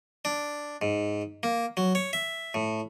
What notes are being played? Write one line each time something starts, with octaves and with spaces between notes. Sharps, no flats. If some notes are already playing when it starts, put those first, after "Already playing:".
D4
G#2
A#3
F#3
C#5
E5
A2